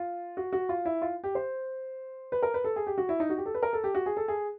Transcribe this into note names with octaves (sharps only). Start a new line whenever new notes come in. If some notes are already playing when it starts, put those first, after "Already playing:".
Already playing: F4
F#4
F#4
F4
E4
F4
G4
C5
B4
A#4
B4
A4
G#4
G4
F#4
E4
D#4
F#4
G4
A4
B4
A#4
A4
G4
F#4
G#4
A4
G#4